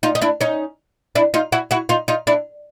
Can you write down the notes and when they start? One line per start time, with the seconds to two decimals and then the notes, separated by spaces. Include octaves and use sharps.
0.03 D#4 F4
0.15 D#4
0.22 D4 E4
0.41 C#4 D#4
1.15 D4 E4
1.34 D#4 F4
1.52 E4 F#4
1.71 E4 F#4
1.89 D#4 F4
2.08 D#4 F4
2.27 D4 E4